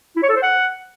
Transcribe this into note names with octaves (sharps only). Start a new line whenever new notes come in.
E4
C#5
A4
C5
F#5